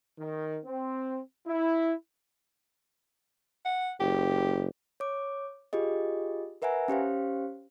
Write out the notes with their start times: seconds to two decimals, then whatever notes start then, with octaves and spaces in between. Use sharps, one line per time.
0.19 D#3
0.65 C4
1.47 E4
3.65 F#5
4.00 F#1 G4
5.00 C#5 D6
5.73 F4 G4 G#4 D#5
6.62 A#4 B4 E5 F#5 G#5 A#5
6.88 C#4 G4 C5 F5